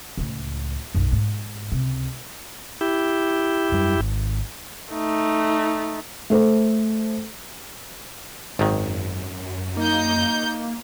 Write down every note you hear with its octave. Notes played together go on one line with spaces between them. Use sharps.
C#2 A2
B1 F#2
G#2
C#2 C3
E4 G4
F#2 G3
G#1
A3 D#4
A3 A4 C5
G#1 F#2 D#3
A#3 D#4 G6